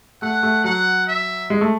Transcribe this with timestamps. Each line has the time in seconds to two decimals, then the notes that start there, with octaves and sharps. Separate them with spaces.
0.22 A3 F#5
0.43 A3
0.64 F#3 F#5
1.07 E5
1.50 G#3
1.61 A3